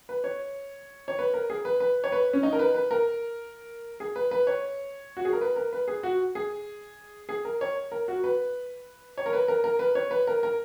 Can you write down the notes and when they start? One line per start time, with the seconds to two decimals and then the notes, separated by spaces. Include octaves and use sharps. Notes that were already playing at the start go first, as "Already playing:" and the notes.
0.09 B4
0.24 C#5
1.08 C#5
1.19 B4
1.34 A#4
1.50 G#4
1.65 B4
1.80 B4
2.04 C#5
2.12 B4
2.33 C#4
2.43 D#4
2.53 A#4
2.59 B4
2.74 B4
2.91 A#4
4.00 G#4
4.16 B4
4.31 B4
4.47 C#5
5.17 F#4
5.25 G#4
5.33 A#4
5.41 B4
5.56 A#4
5.73 B4
5.88 G#4
6.03 F#4
6.35 G#4
7.29 G#4
7.45 A#4
7.61 C#5
7.92 A#4
8.08 F#4
8.24 B4
9.18 C#5
9.26 A#4
9.33 B4
9.48 A#4
9.64 A#4
9.79 B4
9.95 C#5
10.11 B4
10.27 A#4
10.43 A#4